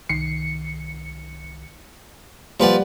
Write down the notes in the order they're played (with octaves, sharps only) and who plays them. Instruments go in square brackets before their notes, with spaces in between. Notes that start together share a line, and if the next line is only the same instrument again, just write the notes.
[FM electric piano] C2 D#3 C#7 [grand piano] C7
[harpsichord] F3 B4 D5 [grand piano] G3 F#5 [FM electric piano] A#3